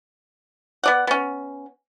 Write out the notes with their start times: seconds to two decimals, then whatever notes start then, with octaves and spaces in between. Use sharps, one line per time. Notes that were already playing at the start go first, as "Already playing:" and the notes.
0.83 B3 D5 F#5
1.07 B3 C#4